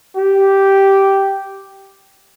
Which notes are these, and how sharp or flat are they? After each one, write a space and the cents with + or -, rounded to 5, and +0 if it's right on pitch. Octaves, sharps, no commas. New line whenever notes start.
G4 -5